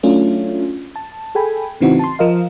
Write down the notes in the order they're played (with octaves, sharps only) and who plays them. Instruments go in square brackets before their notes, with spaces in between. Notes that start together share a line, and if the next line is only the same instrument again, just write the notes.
[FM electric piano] F#3 A3 C#4 D4 F4
A5
G#4 A4 G5 G#5 B5
A2 C#3 E3 C4 D#4 F#4
A5 C6
F3 A#4 D#5 F5